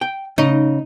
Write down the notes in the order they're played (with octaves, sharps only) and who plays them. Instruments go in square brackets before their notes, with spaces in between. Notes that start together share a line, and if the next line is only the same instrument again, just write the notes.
[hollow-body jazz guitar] G5
[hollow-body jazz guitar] C#3 [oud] D#4